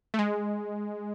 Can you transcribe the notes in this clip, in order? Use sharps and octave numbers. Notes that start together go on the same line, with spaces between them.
A3
G#3